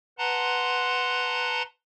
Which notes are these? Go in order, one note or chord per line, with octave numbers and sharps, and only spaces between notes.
B4 F#5 A5 A#5 C6